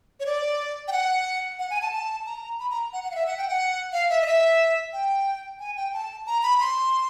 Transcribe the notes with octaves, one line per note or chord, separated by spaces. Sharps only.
C#5
D5
G5
F#5
F#5
G#5
A5
A5
A#5
B5
A#5
F#5
F#5
F5
E5
F#5
G5
F#5
F5
E5
D#5
E5
G5
G#5
G5
A5
A#5
B5
C6